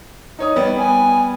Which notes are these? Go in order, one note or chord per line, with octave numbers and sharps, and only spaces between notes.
D#4 C#5 D#6
G3 B3
G#5